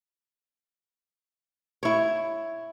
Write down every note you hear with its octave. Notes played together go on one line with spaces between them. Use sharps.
E4 C#5